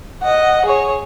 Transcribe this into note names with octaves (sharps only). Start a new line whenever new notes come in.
D#5 F#5
G#4 C#5